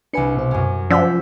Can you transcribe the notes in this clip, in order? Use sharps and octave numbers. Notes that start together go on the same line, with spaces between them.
C2 D4 B4 G#5 C#7
B2 C5
F#2 C#4
F3 C#4 D5 F#5 E6 G6 B6